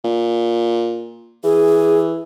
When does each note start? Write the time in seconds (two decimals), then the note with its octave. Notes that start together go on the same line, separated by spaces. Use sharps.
0.05 A#2
1.44 E3 G#4